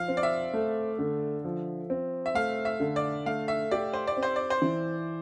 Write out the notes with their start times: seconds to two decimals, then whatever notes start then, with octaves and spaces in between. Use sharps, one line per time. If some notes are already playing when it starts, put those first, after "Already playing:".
Already playing: F3 F5
0.08 C4
0.17 D5
0.23 E5
0.53 A3
0.99 D3
1.44 F3
1.90 C4
2.26 E5
2.35 A3 F5
2.65 E5
2.80 D3
2.96 D5
3.26 A3 F5
3.48 E5
3.71 G4 D5
3.93 C5
4.07 D5
4.17 C4
4.23 C5
4.36 D5
4.50 C5
4.62 E3